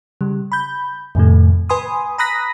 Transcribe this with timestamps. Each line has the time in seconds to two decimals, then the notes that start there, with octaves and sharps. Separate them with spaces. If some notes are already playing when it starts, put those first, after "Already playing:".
0.21 C#3 G3
0.52 B5 G6
1.15 F2 A2 C3 D#3 A3
1.69 B4 G#5 B5 C6 D#6
2.18 A#5 B5 D#6 F#6 A#6 B6